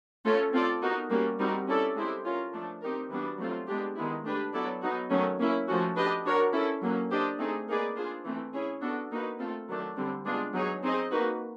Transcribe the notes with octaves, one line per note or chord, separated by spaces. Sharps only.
A3 C#4 F4 A4 C#5
C4 F4 A4 D5
B3 D#4 F#4 A#4
G3 A#3 C#4 F#4
G3 C4 D#4 F#4 A#4
C#4 E4 A4 D5
G#3 C4 E4 G4 C5
C#4 F4 A#4
F3 A3 D4
C4 D#4 G4 A#4
E3 G3 B3 D4 F#4
F#3 A3 C4 F4
G#3 B3 D4 G4
D#3 G#3 B3 E4
A3 D4 G4 B4
F#3 B3 E4 A4 D5
F#3 B3 D#4 F#4
D#3 F#3 A3 C#4
A#3 C#4 E4
F3 A3 C#4 F#4
D4 G4 B4 D#5
D4 F#4 A#4 C#5
C#4 E4 A4
F#3 A#3 C#4
D4 G4 C5 D#5
A3 C4 D#4 G#4
A#3 D#4 G#4 B4 D5
D4 F4 G#4 C5
E3 A3 C4
C#4 E4 G#4 C#5
B3 D4 F#4 A4
A#3 D#4 F#4 B4
A3 C4 F4 A4
D#3 F#3 A3 D4
D3 G3 C4
G#3 B3 D4 F4 G#4
F#3 B3 D#4 G#4 C#5
C4 D#4 G#4 C5 D#5
A#3 D#4 F#4 B4